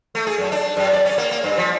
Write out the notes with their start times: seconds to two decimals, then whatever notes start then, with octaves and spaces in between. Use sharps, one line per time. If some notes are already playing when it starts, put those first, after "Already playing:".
0.15 A3
0.27 G#4
0.38 F#2
0.52 D4
0.77 F#2
0.93 D5
1.06 C#4
1.18 A#3
1.31 A#3
1.44 G2
1.57 F3